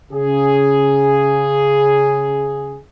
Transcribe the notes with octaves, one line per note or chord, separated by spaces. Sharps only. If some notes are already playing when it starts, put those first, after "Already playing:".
C#3 G#4